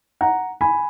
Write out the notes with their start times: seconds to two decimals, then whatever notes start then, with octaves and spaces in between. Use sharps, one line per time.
0.21 F#5 A#5
0.61 G#5 B5